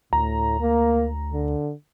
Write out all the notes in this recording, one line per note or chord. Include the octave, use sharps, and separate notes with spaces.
D2 A2 A#5
A#3
D3